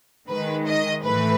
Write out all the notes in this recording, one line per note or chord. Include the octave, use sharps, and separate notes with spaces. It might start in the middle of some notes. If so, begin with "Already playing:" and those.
D#3 G#3 B4
D#5
A2 E3 A3 B4